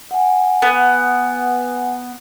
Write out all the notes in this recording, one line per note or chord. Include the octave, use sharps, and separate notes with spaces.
F#5 G#5
B3